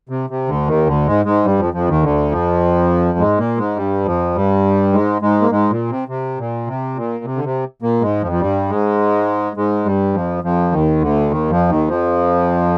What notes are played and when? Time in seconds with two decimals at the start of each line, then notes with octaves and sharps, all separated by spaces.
0.09 C3
0.30 C3
0.48 D2 D3
0.68 D#2 D#3
0.87 D2 D3
1.07 G#2 G#3
1.25 G#2 G#3
1.45 G2 G3
1.59 F2 F3
1.74 F2 F3
1.88 D#2 D#3
2.03 D2 D3
2.31 F2 F3
3.18 G#2 G#3
3.38 A#2 A#3
3.57 G#2 G#3
3.76 G2 G3
4.05 F2 F3
4.35 G2 G3
4.93 G#2 G#3
5.21 G#2 G#3
5.41 A#3
5.51 G#2 G#3
5.70 A#2
5.90 C3
6.08 C3
6.38 A#2
6.67 C3
6.95 A#2
7.24 C3
7.36 D3
7.44 C3
7.82 A#2 A#3
8.02 G#2 G#3
8.22 F2 F3
8.32 F3
8.40 G2 G3
8.69 G#2 G#3
9.56 G#2 G#3
9.85 G2 G3
10.14 F2 F3
10.43 F2 F3
10.72 D#2 D#3
11.02 D2 D3
11.30 D#2 D#3
11.50 F2 F3
11.69 D#2 D#3
11.88 F2 F3